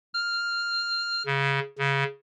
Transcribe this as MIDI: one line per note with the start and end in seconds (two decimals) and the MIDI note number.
0.14 1.23 89
1.26 1.60 49
1.78 2.04 49